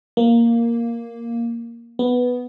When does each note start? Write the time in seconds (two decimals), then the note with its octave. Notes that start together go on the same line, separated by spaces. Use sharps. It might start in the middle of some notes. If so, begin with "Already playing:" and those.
0.17 A#3
1.99 B3